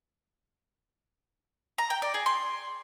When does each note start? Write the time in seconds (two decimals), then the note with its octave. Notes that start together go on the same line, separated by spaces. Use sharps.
1.78 A#5
1.90 G5
2.02 D5
2.14 G#4
2.26 C6